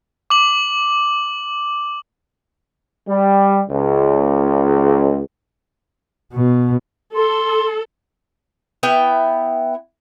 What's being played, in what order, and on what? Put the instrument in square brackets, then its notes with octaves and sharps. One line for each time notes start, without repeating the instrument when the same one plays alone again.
[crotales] D6 F#7
[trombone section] G3
C#2
[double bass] B2
[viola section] A4 [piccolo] C6
[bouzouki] B3 E4 G5